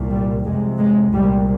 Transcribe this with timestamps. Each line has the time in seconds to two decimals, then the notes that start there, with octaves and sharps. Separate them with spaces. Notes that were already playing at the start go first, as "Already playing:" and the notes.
Already playing: C2 A#2
0.10 G3
0.45 F2 C3 G#3
0.78 G#3
1.12 C2 A#2 G3